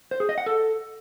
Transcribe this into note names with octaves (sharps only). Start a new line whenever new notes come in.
C5
G#4
D#5
F#5
A4